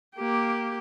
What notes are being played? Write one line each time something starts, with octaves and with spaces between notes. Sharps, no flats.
A#3 G4